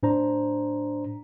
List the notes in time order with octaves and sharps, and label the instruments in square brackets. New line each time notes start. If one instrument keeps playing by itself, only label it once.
[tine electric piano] A2 D4 C5 A#5